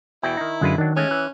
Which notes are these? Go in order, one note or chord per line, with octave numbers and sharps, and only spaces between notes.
E2 B2 E4 G5
D#3 D#4
F#2 D3 G#3 F4 B4
D#3 F#3 D4
G#3 A3 C#4
E3 F#6